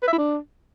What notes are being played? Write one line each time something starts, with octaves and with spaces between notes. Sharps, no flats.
B4
E5
E4
D4